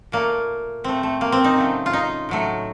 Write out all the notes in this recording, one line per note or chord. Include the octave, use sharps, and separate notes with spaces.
A#2 A3 A#3
A2 A3 C4
A3
A#3
C4
D#4
C#3 F#3 A3
F4
D#4
A2 F#3 A3